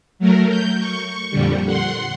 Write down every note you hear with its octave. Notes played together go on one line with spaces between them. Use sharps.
F#3 A3 A#4
G6
C#6
F2 A#2 D3 G3
F#5 C6